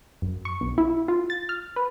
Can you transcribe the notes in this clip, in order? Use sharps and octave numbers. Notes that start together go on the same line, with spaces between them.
F#2
C#6
B1
E4
F4
A6
F6
B4